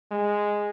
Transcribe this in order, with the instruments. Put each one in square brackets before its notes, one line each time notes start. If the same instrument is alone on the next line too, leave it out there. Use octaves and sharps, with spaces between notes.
[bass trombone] G#3